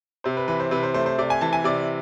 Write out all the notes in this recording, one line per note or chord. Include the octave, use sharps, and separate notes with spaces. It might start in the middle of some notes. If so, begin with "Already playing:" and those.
C3 C5
B4
E3 B4
C5
C3 B4
C5
A3 C5
C5
C3 D5
G#5
E3 A5
G#5
C3 D5